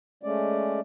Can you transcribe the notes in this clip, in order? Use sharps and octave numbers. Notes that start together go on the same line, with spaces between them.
G#3 A3 C#4 D5